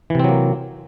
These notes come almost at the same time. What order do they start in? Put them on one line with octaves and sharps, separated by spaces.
E3 C3 C4 F#3 A#3